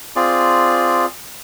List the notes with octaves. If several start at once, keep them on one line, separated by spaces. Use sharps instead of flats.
C4 F4 G#4 D5